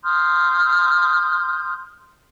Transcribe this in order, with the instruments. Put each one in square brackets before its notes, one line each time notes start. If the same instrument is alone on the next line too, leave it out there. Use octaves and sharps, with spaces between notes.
[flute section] C6 D#6 F6 G6